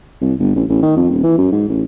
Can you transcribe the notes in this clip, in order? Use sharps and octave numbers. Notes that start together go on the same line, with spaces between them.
C2
G1
A1
A1
D#3
F2
D#1
E3
F#2
G#2
A1